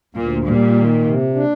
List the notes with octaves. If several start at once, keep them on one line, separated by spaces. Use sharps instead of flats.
D2 A#2
A#2 G3
D#3
C3
D4